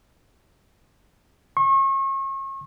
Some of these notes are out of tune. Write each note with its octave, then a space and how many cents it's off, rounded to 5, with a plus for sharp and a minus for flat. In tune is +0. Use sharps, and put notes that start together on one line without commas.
C#6 -35